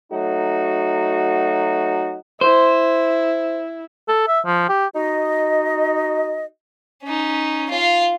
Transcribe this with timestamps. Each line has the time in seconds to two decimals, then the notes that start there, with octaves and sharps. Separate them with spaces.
0.12 F#3 A3 D#4 F#4
2.41 E4 C5
4.09 A4
4.28 E5
4.46 F3
4.69 G4
4.96 D#4 F#4 D#5
7.04 C#4 D#4
7.70 F4 F5